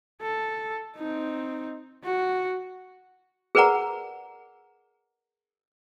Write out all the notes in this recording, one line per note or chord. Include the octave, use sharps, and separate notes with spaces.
A4
C4 D#4
F#4
G#4 A#4 B4 D5 F#5 A#5